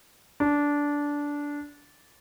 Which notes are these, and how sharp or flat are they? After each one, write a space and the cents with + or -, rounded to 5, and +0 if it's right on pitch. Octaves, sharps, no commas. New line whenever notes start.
D4 -15